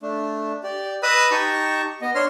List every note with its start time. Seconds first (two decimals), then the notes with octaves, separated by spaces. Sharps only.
0.02 A3 D4
0.63 G4 D5
1.03 B4 D#5 B5 D#6 E6 F#6
1.31 D#4 G4 A5 A#5 C#6
2.01 B3 D#5
2.15 D4 C#5 C6 F6